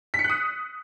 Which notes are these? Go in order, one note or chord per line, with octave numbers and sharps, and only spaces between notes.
B6
C#7
F#6
D#6